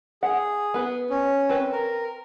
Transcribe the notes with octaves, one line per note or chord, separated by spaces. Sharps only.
G#4 F#5
B3 B4
C#4
C4 B4
A#4